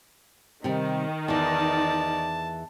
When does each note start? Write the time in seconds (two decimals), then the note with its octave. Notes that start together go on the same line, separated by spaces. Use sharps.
0.64 C3 D#3 G3
1.28 E2 E3 D#4 D5 A5